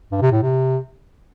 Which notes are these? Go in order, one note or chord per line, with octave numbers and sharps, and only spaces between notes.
G2
C3
A2
C3